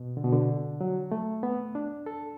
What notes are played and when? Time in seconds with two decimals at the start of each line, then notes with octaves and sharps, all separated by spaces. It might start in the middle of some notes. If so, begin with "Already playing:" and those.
Already playing: B2
0.17 D3
0.24 B2
0.33 D3
0.81 F#3
1.12 A3
1.43 B3
1.75 D4
2.06 A4